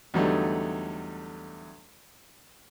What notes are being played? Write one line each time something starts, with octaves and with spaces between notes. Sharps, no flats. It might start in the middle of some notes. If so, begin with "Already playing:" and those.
E2 D3 F#3 G3 A3 D#4